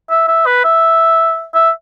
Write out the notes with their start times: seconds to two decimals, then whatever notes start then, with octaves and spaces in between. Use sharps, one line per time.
0.10 E5
0.28 E5
0.46 B4
0.64 E5
1.54 E5